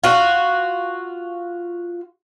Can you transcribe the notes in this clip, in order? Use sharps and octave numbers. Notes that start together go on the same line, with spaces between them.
F4 F#4